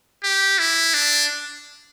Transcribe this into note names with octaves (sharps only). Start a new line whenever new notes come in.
G4
E4
D4